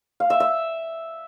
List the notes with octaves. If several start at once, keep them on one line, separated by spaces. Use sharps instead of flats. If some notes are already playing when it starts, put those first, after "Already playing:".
F5
E5
E5